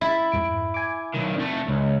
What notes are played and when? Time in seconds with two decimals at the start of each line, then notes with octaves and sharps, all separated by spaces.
0.01 E4 B5 A6
0.32 F2 G#2 D7
0.74 G#5 D6
1.14 B1 D#3
1.35 F2 A3 D4
1.68 C#2